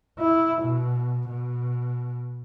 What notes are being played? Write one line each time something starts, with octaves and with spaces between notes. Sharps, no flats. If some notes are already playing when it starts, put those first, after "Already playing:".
E4
B2
B2